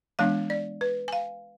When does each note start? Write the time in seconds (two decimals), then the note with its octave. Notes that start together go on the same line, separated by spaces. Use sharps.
0.19 E3 G#3 B3 D4 F5
0.50 D5
0.81 B4
1.08 G#5
1.13 F5